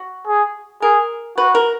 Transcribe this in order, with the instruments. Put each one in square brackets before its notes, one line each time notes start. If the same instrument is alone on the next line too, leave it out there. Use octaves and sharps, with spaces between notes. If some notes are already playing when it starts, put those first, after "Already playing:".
Already playing: [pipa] F#4
[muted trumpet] G#4
[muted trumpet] G#4 [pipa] A#4
[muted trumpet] F#4 [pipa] B4
[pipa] A#4